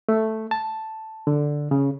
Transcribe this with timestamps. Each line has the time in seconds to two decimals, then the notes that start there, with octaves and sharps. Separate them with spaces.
0.09 A3
0.51 A5
1.27 D3
1.71 C#3